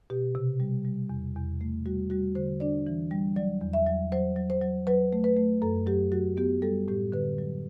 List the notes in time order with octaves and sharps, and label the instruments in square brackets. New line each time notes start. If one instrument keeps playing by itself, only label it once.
[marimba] B2 G4
C3
G3
G3
E2
E2
A3
G3 F#4
G3 F#4
D3 C5
D4 D5
E3
G3
F#3 D5
E2
E5
F#3
F#3 C5
F#3
C5
F#3
F#3 B4
A3
B4
A3
F#2 A4
F#3 G4
F#3 F#4
B3 G4
G3 A4
A2 G4
D3 B4
F#3